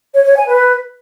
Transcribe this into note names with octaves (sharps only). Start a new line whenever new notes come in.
C#5
C#5
G#5
B4